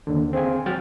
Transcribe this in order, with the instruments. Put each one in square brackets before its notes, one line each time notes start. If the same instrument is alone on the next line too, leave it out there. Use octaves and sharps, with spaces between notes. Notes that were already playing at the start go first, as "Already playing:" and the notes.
[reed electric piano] D#2 D3
C4 G#4 F5 G#5
F#3 F#5 G5 F6 A6